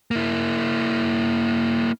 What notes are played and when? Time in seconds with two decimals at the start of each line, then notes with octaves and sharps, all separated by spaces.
0.11 A#3 E4